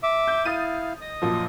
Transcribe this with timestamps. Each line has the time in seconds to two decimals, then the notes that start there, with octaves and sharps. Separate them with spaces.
0.03 E5 D6
0.27 G6
0.45 E4 F5 D#6 A6 D#7
1.01 D#5 D#6
1.22 F#2 A#2 F3